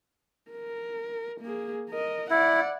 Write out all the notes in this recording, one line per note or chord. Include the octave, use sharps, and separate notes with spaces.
A#4
A#3 G#4
A#4 D#5
E4 D5 F#5